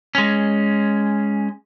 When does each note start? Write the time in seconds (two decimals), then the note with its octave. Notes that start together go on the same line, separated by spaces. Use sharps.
0.15 G#3 C#4